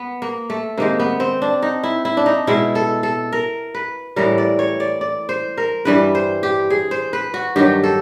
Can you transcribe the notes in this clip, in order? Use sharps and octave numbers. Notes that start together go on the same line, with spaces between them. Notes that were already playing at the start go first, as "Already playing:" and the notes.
Already playing: B3
A#3
A3
C3 D#3 G#3 A#3
B3
C4
D4
D#4
E4
E4
D4
D#4
B2 G#3 E4
A4
A4
A#4
B4
A2 E3 G3 A#4
D5
C#5
D5
D5
C5
A#4
G2 E3 G3 B4
C5
G4
G#4
C5
B4
F#4
G2 D#3 F#3 G4
A4